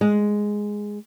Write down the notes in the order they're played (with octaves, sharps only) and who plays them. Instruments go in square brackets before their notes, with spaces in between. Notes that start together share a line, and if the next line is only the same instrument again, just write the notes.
[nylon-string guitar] G#3